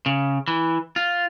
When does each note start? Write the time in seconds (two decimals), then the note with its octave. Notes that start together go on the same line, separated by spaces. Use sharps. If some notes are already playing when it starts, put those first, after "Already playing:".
0.06 C#3
0.48 E3
0.96 F4